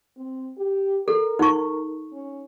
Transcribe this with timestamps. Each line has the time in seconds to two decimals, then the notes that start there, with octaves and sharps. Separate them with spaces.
0.17 C4
0.58 G4
1.08 A4 A#4
1.39 D#4 C#6
2.13 C#4